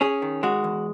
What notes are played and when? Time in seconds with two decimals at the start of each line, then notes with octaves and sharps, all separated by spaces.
0.01 C#4 G#4
0.22 D#3
0.43 G#3 F#4
0.64 E2